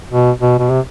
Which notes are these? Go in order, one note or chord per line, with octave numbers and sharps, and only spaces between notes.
B2
B2
B2
C3